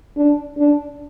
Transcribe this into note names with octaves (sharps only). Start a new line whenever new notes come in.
D4
D4